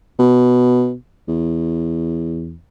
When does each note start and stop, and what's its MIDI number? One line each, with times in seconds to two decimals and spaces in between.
0.19 0.94 47
1.28 2.56 40